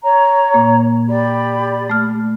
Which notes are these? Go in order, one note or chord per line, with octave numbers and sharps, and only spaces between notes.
C#5 A#5
A#2 A#3
G4 D5 B5
A3 F6